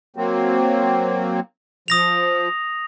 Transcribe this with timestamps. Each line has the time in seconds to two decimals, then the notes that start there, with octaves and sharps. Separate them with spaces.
0.16 F#3 A#3 C4
1.88 F3 D#6 A#6 F7